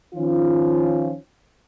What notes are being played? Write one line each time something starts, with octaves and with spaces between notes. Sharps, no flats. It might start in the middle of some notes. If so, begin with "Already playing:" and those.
D#3 F3 C#4 F4